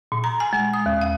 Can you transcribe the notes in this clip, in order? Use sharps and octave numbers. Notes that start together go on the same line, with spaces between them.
A#2
A#5
G#5
G#3
D#6
D#2
F5